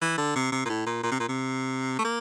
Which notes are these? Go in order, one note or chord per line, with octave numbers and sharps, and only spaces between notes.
E3
D3
C3
C3
A#2
A2
A#2
A#2
C3
A#2
C3
A3
A#3